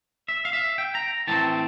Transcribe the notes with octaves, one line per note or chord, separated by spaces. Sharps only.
E5
F5
E5
G5
A#5
A2 E3 A3 C4 A5